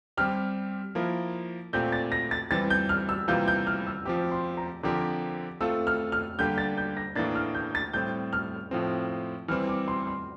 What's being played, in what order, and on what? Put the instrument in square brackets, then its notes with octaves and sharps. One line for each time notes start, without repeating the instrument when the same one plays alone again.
[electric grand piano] G3 C4 G4 [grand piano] F6
[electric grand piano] F3 A#3 E4 A#4
[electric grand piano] A#2 A3 C4 G4 [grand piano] G6
[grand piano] A6
A#6
A6
[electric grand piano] E3 G3 C4 [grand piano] A6
[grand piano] G6
F6
E6
[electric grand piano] C3 E3 G3 A#3 F4 [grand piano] G6
[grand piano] G6
F6
E6
[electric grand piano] F3 C4 G4 [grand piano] D6
[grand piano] C6
A#5
[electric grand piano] D3 F3 C4 G4 A#4 [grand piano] D6
[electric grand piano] A3 C4 F4 A4 [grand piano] E6
[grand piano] F6
F6
[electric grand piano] D3 G3 A#3 D4 G4 [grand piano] G6
[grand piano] A6
G6
A#6
[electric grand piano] A2 E3 A#3 D4 [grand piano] A6
[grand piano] F6
G6
A6
[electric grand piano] A2 G3 C4 [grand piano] G6
[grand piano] F6
[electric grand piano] A2 F3 C4
[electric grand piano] E3 G3 C4 [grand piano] F6
[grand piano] D6
C6
C6